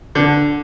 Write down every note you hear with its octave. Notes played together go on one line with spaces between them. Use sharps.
D3